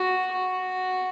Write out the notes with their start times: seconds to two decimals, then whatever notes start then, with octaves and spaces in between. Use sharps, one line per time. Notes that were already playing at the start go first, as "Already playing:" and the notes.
Already playing: F#4
0.32 F#4